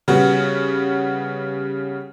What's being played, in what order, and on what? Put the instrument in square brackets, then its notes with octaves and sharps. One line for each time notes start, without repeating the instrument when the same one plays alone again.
[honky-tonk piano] C#3 G3 B3 F#4